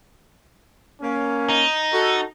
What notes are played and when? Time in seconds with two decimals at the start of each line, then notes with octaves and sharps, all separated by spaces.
1.01 A#3 C#4
1.49 D#4
1.93 F#4 A4